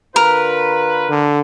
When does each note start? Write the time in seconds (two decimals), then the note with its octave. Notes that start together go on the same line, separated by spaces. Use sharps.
0.16 D3 F4 A#4 B4
1.10 D3